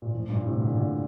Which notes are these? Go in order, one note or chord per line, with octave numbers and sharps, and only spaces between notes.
A#2
F2 A2
G2 A#2
A2 C3
A#2 D3
A#2 D3